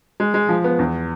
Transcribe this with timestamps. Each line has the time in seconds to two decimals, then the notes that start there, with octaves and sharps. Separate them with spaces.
0.20 G#3
0.34 G#3
0.49 F3
0.64 B3
0.79 E2